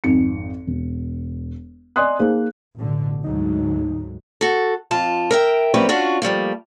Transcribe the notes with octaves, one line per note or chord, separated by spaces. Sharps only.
G#1 F2 D#4 C#7
E1
D5 D#5 G#5 C6 D#6 F#6
A#3 D#4 G#4 C5
A1 B2 D3
D2 G#2 F#3 D#4
F#4 A4
F2 F4 A5
A#4 E5 G5
F#3 G3 A#3 C4 C#4 B4
C#4 D4 F4 F#4
F3 G3 A3 A#3